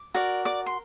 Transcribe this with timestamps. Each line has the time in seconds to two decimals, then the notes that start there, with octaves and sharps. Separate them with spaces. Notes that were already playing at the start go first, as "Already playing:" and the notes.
Already playing: D6
0.14 F#4 A#4 D5
0.45 D5 D6
0.66 C6